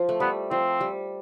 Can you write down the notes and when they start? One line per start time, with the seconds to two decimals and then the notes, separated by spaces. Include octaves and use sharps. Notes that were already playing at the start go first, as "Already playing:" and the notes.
Already playing: F3
0.09 A3
0.20 G3 B3
0.51 F3 C4
0.81 G3